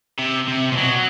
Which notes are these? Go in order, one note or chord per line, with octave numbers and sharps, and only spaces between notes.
C3
C3
A#2
B2 F#3